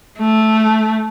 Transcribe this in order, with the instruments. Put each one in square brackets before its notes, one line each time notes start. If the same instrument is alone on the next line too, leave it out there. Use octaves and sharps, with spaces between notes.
[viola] A3